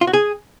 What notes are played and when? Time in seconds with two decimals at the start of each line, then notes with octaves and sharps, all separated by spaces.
0.01 F4
0.07 F#4
0.13 G#4